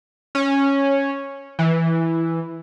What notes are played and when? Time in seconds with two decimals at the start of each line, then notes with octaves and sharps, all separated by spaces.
0.35 C#4
1.59 E3